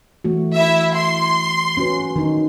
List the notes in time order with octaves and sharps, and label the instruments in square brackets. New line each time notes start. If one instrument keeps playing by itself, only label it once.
[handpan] E3 A3 F#4
[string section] E4 E5
C6
[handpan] C#4 F#4 B4
D#3 D#4